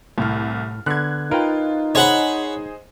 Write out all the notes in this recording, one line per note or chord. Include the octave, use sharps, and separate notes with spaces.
C2 A2 F6
D3 B3 F#6 G#6
D#4 F4 A#4 B4 G5
G#4 C5 C#5 D#5 F#5 B5